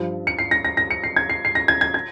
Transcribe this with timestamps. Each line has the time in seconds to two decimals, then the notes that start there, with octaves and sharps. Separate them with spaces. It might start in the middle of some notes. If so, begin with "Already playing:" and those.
Already playing: G2 F3
0.27 C#7
0.39 C7
0.51 A#6
0.65 A#6
0.77 A#6
0.90 C#7
1.04 C7
1.16 G#6
1.30 C7
1.45 C7
1.55 A#6
1.68 G#6
1.81 G#6
1.94 G#6